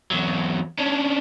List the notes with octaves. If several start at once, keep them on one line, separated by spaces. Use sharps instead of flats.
E2 F#3
C#4 D4